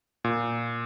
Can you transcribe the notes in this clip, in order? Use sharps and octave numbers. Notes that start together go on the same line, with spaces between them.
A#2